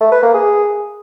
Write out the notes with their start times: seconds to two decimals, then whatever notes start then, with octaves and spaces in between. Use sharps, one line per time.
0.01 A3
0.12 B4
0.23 A#3
0.34 G#4